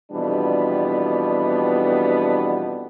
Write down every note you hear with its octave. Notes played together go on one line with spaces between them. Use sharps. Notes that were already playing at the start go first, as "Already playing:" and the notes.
F2 B2 E3 G3 B3 D4